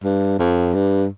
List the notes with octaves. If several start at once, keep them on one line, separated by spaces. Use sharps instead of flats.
G2
F2
G2